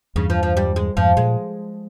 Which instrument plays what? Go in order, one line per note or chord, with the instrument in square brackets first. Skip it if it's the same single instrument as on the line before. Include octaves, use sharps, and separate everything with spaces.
[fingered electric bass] E2 G2 [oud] C#3
[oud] F3
F3
G3
G#3
[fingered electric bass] F2 G#2 [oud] F3
[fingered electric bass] A#2 [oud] G#3